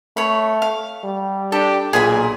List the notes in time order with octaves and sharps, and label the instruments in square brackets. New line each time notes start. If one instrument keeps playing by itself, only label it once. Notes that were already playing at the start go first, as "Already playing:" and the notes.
[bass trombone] A3 [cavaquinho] C#5 B5
[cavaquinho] F5
[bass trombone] G3
[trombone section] D4 G4 [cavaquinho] A4
[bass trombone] B1 [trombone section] A#2 [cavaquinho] G#4 G#5 B5